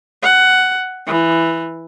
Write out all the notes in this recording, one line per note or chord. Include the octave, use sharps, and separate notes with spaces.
F#5
E3